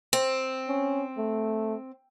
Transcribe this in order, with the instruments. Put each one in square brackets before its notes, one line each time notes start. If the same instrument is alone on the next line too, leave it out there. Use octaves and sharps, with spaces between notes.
[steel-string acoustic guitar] C4
[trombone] C#4
A3